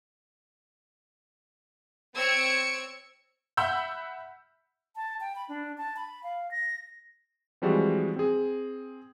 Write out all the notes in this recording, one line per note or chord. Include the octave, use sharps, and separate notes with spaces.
C4 C#5 E6 G#6 C#7 D7
E5 F#5 B5 E6 G6
A5
G5
B5
D4
A5
B5
F5
A#6
E3 F3 G3 G#3 C4 F#4
C4 G#4